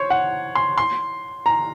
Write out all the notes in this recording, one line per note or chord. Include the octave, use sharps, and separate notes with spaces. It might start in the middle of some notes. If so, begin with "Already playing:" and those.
Already playing: C5 C#5
F#5
C6
C6
A#5